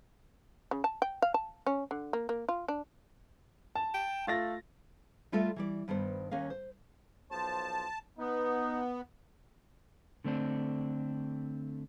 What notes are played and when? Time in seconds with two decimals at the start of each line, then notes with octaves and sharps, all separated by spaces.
0.71 C#3
0.84 A5
1.02 G5
1.22 F5
1.34 A5
1.67 C#4
1.91 D3
2.13 A#3
2.29 A#3
2.49 F4
2.68 D4
3.75 A5
3.94 G5
4.27 A3 F4 A6 A#6
5.32 G3 A3 F4 A4 D#5 E5
5.56 E3 G3 D5
5.88 G2 D#3 B3 C5
6.31 D#2 C#4 A#4 F5
6.50 C5
7.31 B1 F3 C5 A5
8.18 B3 D#4
10.24 D3 A3 C4 D4